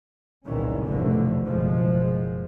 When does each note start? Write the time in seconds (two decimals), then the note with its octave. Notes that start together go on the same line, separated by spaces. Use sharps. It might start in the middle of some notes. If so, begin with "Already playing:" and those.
0.47 F#1 C2 A#2 D#3 E3 C#4
0.84 F1 B1 E2 D3 F3 A3
1.46 F#1 B2 F3 G#3